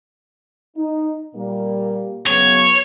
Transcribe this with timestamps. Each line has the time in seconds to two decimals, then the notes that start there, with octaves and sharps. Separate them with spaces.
0.77 D#4
1.35 A#2 G3 A#3
2.27 C#3 F#3 B3 C#5